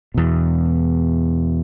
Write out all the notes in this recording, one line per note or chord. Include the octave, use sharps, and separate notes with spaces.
E2 B2